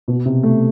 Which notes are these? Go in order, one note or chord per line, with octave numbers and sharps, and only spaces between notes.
B2
C3
A3